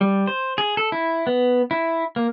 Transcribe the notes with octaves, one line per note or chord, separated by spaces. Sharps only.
G3
C5
G#4
A4
E4
B3
E4
A#3